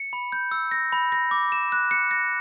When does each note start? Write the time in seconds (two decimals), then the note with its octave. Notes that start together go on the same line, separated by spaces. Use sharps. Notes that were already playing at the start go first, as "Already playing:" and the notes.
Already playing: C#7
0.13 B5
0.32 G6
0.51 E6
0.71 A#6
0.93 B5
1.12 A#6
1.31 D6
1.52 E7
1.72 F#6
1.91 C#7
2.11 A#6